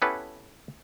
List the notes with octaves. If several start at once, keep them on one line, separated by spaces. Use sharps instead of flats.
B3 C#4 E4 G4 A4 B4